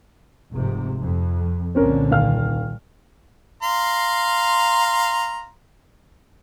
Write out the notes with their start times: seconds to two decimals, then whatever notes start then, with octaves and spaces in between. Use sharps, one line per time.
0.53 F1 G#2 C3
0.99 F2
1.75 C2 A#2 D3 C4 C#4 A#4
2.11 D#1 F5 F6
3.62 F5 A#5 C6